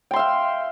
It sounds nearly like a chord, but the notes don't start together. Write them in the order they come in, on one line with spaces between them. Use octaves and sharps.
G5 C6 E5 F5